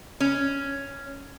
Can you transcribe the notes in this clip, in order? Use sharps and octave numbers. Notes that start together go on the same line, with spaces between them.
C#4